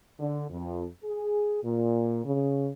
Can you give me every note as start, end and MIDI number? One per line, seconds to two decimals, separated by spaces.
0.19 0.43 50
0.49 0.84 41
1.02 1.61 68
1.63 2.21 46
2.24 2.69 49